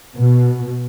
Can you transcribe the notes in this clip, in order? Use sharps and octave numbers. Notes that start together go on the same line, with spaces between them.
B2